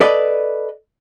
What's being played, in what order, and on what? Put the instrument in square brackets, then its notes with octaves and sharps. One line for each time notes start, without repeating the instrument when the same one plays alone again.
[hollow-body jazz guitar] A4 B4 D5 D#5